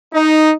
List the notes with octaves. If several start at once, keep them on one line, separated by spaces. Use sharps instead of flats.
D#4